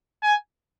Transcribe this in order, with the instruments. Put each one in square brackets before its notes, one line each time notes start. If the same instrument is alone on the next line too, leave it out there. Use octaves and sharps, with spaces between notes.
[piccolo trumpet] G#5